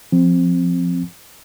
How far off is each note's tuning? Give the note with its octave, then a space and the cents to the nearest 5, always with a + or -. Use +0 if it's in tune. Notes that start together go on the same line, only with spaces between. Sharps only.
F3 +0 C4 +0